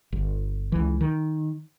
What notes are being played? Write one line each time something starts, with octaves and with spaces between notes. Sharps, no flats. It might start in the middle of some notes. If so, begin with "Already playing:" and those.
G1
C#2 E3
D#3